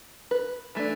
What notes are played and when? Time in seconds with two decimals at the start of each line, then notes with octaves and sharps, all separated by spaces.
0.31 B4
0.75 E3 A3 D4